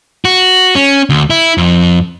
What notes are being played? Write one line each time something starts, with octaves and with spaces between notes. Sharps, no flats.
F#4
C#4
D2
E4
F2